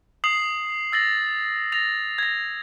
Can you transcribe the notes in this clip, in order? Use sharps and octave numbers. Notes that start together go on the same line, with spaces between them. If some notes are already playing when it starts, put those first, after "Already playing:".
D#6 C7 F#7
E6 A6 A#6 F#7
A6 A#6 F7
G#6 A#6